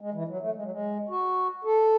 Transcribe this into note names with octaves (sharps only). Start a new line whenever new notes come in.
G#3
E3
F#3
A3
G#3
F#3
G#3
F#4
A4